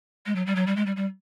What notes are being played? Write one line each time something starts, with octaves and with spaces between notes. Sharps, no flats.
G#3
F#3
G3
F#3
G3
G#3
G3
G3